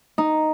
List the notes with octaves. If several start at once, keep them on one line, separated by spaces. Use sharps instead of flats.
D#4